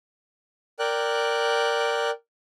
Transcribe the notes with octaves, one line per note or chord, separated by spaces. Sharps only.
A#4 D5 G5 F#6